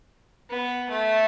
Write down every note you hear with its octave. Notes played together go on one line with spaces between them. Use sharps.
B3
A3